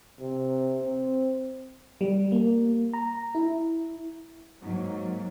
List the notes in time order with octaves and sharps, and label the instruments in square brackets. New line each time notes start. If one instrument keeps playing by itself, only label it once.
[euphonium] C3
C4
[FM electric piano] G3
A#3
A#5
E4
[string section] G#2 F#3 A#3